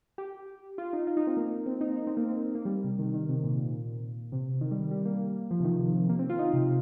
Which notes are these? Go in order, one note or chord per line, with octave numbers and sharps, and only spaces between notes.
G4
F4
D#4
F4
D#4
C4
A#3
C4
D#4
D#4
C4
A#3
C4
A#3
G3
C3
D#3
D#3
C3
A#2
C3
D#3
G3
G3
A#3
F3
C3
D#3
C3
A#3
C4
F4
D#4
C3